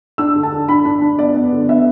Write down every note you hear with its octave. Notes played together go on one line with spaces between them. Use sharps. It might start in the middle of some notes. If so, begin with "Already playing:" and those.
D4 E6
D3
A5
D3
D4 B5
D4
D4
B3 D5
B3
D3
B3 E5